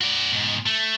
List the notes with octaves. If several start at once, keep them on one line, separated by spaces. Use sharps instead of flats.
F#4 D5
G#2 B2
A3